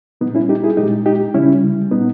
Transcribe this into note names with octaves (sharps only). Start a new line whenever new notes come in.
A#2 G3 B3 D#4
C#4 E4
D#4 G4
E4 G#4
A#2 G#3 D#4 G4
D#4 G4
C#3 G3 C#4 E4
A#2 G3 B3 D#4